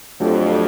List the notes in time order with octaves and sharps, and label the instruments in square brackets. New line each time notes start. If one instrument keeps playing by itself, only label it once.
[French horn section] F2 [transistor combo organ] F#3 A3 D4 G4